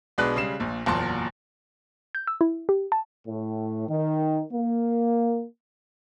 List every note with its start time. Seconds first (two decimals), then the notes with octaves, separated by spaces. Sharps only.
0.18 B1 B2 G#3 D4 B4 F#6
0.36 C#3 G3 G#3 C7 E7
0.60 A#1 A#2
0.86 F#1 E2 A#2 F#3 A5 C6
2.15 G6
2.27 E6
2.41 E4
2.69 G4
2.92 A5
3.28 A2
3.89 D#3
4.53 A#3